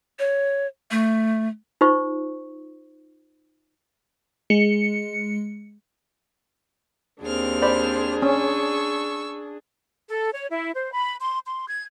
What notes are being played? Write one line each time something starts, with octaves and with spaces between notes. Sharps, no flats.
C#5
A3
D#4 F4 C5 C#6
G#3 C#7
D#2 C4 D4 G#4 F6
C5 D5 B5
C#4 C#6 E6
A4
C#5
E4
C5
B5
C6
C6
G#6